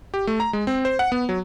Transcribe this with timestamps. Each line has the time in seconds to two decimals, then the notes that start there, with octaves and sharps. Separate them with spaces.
0.14 G4
0.27 A3
0.40 A#5
0.53 G#3
0.67 C4
0.85 C5
0.99 F#5
1.12 B3
1.29 F#3